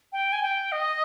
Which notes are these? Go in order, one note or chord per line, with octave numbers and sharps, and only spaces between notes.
G5
G#5
G5
D#5